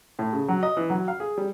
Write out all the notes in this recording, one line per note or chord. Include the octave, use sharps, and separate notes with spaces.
A2
C#3
F#3
D#5
E3
F#3
F5
G#4
G3